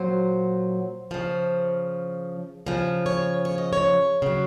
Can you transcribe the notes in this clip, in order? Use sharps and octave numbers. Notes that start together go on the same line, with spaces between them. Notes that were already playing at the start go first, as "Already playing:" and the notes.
Already playing: A#2 F#3 C5
C#3 F3
C#3 F3
C#5
C#5
D#5
C#5
C#3 F#3